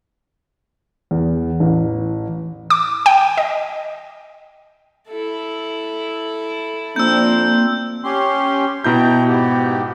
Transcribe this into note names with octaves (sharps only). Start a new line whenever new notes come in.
E2
A1
D6
G5
D#5
E4 A4
F3 A#3 C4 D4 E6 G6
C#4 G4 C6
B2 E4 G5 A#5 G6
G#2 B3 G4